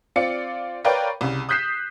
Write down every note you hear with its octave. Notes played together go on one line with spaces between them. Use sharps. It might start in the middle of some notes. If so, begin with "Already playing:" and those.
C4 F4 D5 C#7
A#4 B4 C#5 D5 F5 G5
C2 C#3
D#6 F#6 G6 B6 C7 E7